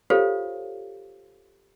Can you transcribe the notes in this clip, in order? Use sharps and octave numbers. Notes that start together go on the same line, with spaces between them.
F4 G4 A4 C5 C#5 F5